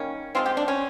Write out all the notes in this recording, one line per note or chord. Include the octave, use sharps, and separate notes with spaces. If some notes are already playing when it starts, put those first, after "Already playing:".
Already playing: D#3 G3 A#3 C#4
F3 G#3 C4 F4
G4
D4
C#4